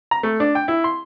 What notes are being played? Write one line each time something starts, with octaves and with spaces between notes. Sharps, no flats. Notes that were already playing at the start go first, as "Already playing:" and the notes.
A#5
A3
D4
G5
E4
C6